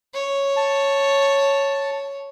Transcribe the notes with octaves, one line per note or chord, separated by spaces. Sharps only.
C#5
A5